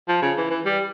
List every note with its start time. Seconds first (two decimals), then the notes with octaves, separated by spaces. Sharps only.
0.08 F3
0.22 C#3
0.38 E3
0.50 E3
0.65 G3